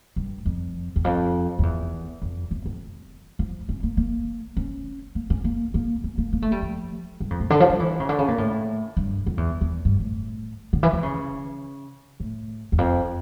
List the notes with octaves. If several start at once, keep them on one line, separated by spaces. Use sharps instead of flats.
G2
F2
E2
F2
F2
E2
F2
E2
F2
F3
C#4
A#3
A#3
C#4
A#3
C#4
A#3
A#3
C#4
A#3
A#3
A3
G3
F3
G2
F2
A#2
D3
F3
G3
E3
C#3
D3
C#3
A#2
A2
G2
F2
E2
E2
G2
A2
D3
E3
E3
C#3
A2
E2
F2